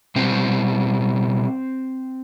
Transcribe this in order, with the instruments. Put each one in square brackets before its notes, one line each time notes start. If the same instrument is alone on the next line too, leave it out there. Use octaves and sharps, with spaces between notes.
[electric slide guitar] B2 G3 C4